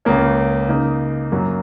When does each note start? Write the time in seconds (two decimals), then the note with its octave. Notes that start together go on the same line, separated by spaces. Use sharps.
0.05 C#2 C#3 A#3 C#4
0.68 C#3 A#3 D#4
1.32 F#2 F#3 A#3